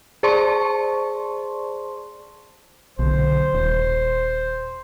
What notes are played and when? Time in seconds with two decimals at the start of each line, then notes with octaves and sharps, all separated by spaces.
0.23 G#4 C5 D5 A5 C6 C#6
2.99 B1 D3 C5
3.54 D#1